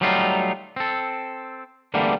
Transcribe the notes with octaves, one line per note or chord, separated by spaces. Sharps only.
F#3 G3 A3 D#4 F4
C4 A4
E2 D3 G3 A3 A#3